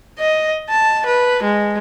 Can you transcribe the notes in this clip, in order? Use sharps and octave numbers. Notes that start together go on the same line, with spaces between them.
D#5
A5
B4
G#3